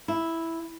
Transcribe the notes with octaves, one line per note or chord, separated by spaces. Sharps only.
E4